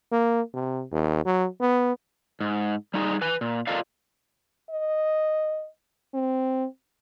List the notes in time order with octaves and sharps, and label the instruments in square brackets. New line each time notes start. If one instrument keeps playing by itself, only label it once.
[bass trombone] A#3
C3
D#2
F#3
B3
[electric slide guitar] G#2
G3 D#4 F4 G#4
B4 G#5
A#2
F4 A4 A#4 D5 D#5 F5
[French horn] D#5
C4